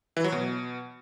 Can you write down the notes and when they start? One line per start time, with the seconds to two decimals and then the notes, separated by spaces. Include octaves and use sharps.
0.17 E3
0.24 F#3
0.32 B2